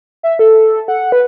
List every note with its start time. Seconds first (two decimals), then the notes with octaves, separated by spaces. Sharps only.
0.23 E5
0.39 A4
0.88 F#5
1.12 B4